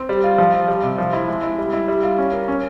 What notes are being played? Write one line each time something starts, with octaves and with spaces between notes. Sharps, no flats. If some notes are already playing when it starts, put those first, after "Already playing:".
Already playing: C4
G3
F4
F3
F4
G3
C3
F3
E4
G#3
E4
G3
E4
G3
F4
C#4
A#4
C#4